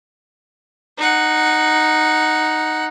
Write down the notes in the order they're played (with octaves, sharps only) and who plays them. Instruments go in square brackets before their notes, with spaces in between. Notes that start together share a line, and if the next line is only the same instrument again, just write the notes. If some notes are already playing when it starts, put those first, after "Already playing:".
[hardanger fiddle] D#4 F#5